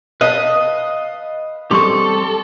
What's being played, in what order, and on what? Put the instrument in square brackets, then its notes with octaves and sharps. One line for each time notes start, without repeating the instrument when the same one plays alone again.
[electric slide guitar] B4 F5 A5 [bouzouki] D#5
[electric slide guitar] G3 C4 G4 [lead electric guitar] A4 [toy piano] C6 C#6